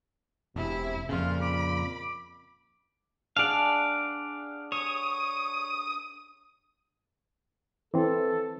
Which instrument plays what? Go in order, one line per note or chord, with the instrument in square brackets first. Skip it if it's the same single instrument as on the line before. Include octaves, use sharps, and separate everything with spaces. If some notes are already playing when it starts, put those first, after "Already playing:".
[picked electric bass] E1 [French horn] C3 [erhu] E4
[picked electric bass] F2 C#3 [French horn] A#2 [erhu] F4
[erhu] B5 [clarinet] D6
[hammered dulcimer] D4 G#4 F#5 [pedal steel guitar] D5 F5
[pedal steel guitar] C#5 [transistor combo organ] D#6
[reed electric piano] E3 C4 [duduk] A4